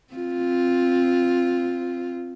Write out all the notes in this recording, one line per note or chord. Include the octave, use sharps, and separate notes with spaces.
C4 F4